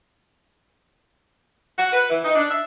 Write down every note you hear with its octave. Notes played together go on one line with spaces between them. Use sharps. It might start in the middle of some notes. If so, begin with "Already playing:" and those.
F#4
B4
E3
D#4
D4
E5